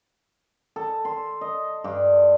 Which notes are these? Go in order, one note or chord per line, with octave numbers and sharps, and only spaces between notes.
A4
C6
D#5
G2